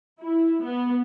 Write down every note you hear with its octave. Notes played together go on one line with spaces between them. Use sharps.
E4
B3